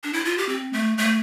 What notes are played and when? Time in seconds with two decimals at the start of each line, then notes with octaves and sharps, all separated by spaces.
0.04 D4
0.13 E4
0.25 F4
0.38 G4
0.49 C4
0.73 A3
0.98 A3